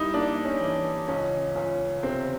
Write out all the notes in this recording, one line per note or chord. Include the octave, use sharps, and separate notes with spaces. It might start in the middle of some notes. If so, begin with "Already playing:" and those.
Already playing: G3 D#4 E4
A#3 D4
C#4
E3
C#2 C#4
C#2 C#4
C3 C4